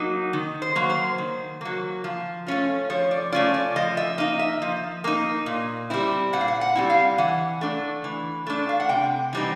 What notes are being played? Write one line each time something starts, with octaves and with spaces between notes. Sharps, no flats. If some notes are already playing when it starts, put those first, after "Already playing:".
Already playing: F#3 A#3 D#4
D#3
C5
F#3 A#3
C5
D#3
F#3 A#3
F3
A3 C#4 F4
F3 C#5
D5
A3 C#4 F4 D5
D5
F3 D#5
E5
A#3 D#4 D#5
E5
F3
A#3 D#4
A#2
G3 C4 E4
A#2 F#5
F5
F#5
F#5
G3 C4 E4
F5
E3 F#5
A3 D4
E3
A3 D4
F5
F#5
C3 G5
E3 G3 C4 D#4